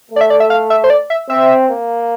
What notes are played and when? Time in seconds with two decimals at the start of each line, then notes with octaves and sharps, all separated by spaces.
0.11 A3
0.16 D5
0.21 E5
0.30 D5
0.40 E5
0.50 F5
0.70 E5
0.84 C5
0.90 D5
1.10 E5
1.29 C4 E5
1.69 A#3